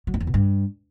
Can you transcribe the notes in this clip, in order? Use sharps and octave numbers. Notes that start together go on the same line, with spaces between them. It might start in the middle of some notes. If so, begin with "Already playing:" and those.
F#3
F2
E2
B2
G2